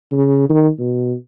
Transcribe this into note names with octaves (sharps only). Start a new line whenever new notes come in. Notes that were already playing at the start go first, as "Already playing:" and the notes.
C#3
D#3
B2